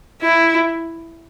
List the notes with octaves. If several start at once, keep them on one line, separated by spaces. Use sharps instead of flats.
E4